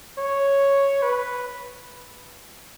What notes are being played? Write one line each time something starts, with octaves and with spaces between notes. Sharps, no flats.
C#5
B4